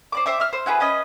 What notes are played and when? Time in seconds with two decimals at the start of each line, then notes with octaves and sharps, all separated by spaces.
0.12 C5 D5 D6
0.26 C5 E5 D6
0.40 E5 F6
0.53 C5
0.66 E4 F#4 G#4 B4
0.80 C#4 B4 D#5